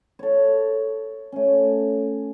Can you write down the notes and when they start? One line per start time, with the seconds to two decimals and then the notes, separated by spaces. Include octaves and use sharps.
0.19 A4 C#5
1.32 A3 C#4